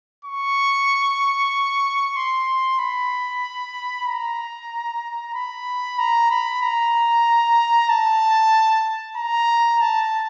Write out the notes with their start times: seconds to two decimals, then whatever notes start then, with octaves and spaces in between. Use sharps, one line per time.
0.25 C#6
2.16 C6
2.79 B5
4.07 A#5
5.34 B5
5.99 A#5
6.31 B5
6.62 A#5
7.90 A5
9.17 A#5
9.81 A5